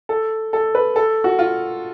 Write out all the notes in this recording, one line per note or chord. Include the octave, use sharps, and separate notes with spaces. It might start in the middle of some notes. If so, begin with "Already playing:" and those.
A4
A4
B4
A4
F#4
F4